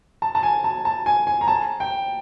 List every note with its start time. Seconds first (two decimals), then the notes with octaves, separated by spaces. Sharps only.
0.22 A5
0.35 A5
0.43 G#5
0.64 A5
0.85 A5
1.06 G#5
1.27 G#5
1.41 A#5
1.48 A5
1.80 G5